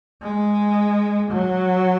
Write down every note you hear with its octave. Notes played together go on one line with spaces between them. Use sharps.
G#3
F#3